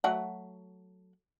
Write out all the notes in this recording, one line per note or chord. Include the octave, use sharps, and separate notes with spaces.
F#3 A3 F#5